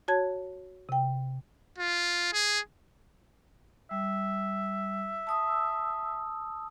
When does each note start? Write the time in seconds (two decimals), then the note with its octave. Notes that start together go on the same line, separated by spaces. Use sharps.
0.08 F#4 C#5 A5 G#6
0.89 C3 G5
1.79 F4
2.33 G#4
3.91 G3 E5
5.27 A5 D#6 E6